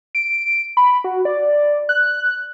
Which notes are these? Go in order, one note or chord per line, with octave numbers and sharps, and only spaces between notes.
D7
B5
F#4
D5
F#6